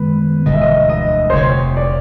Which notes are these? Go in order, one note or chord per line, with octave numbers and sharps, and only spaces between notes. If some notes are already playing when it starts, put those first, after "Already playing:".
Already playing: F#2 D#3 G#3 B3 B4
E1 D2 D3 G3 D#5
E5
D#5
D#5
C5
F1 F2 C3 C#5
D5